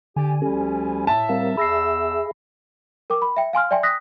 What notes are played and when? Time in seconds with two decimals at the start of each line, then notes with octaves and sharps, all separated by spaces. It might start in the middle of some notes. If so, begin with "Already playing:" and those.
0.16 D3 G4 D5 G#5
0.42 D2 F3 G3 C#4 G4 A4
1.07 A2 E5 A5
1.29 G3 C4 A#4 F5
1.57 E2 G#4 E5 B5 E6 A#6 C7
3.10 A#4 G5 D6
3.22 B5
3.37 E5 G5
3.53 F5 G#5 C6 F6
3.71 D5 E5 G5 G#5 C6
3.83 D#6 F#6 A#6 B6